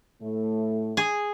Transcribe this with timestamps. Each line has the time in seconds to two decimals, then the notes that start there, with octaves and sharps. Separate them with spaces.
0.22 A2 A3
0.97 G#4